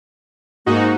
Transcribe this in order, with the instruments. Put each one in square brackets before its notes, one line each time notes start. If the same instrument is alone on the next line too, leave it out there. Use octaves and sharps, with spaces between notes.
[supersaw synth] G#2 D#4 F#4 [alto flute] A#3